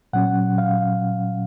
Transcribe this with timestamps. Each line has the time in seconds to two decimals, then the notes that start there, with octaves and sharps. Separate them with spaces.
0.13 A#2 F#3 C#4 F#5
0.58 F5